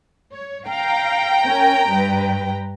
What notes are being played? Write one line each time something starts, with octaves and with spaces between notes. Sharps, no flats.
C#5
F5 G5 A#5
C#4 A#4
G2 B4